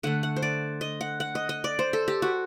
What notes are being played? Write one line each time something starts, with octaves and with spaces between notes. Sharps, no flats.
D3 A3 F#5
F#5
C5
D5
D#5
F#5
F#5
D#5
D#5
D5
C5
A4
G4
F#4